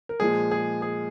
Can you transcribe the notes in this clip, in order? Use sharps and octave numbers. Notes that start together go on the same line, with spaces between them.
A#4
A#2 F3 G#3 G#4
G#4
G#4